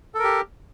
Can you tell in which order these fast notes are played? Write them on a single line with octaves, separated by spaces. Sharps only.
A4 A#4 G4